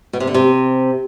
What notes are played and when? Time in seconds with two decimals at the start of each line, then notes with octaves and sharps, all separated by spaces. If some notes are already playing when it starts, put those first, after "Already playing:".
0.13 B2
0.20 C3
0.27 D3
0.34 C3